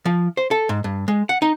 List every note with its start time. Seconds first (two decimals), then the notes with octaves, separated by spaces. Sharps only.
0.05 F3
0.37 C5
0.51 A4
0.69 G#2
0.84 G2
1.08 G#3
1.29 F#5
1.42 D#4